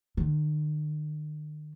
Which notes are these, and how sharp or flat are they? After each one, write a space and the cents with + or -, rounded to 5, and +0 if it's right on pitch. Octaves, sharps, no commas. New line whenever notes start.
D#3 -45